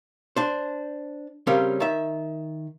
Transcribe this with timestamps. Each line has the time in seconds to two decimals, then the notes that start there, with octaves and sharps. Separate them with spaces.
0.37 D4 C5
1.47 C#3 G3 C4 C#4 A#4
1.80 D#3 E5